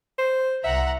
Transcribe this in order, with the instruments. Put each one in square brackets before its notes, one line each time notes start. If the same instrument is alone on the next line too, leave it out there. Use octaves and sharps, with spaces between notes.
[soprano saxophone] C5
[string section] C2 F#5 A#5 [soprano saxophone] E5